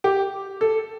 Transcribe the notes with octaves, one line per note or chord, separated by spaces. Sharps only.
G4
A4